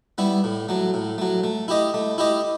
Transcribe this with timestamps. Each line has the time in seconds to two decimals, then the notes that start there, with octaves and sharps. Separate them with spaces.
0.18 G3 B3 E4
0.44 A2
0.69 F#3 A3
0.94 A2
1.18 F#3 A3
1.44 A3
1.68 E4 G4 D#5
1.94 A3
2.18 E4 G4 D#5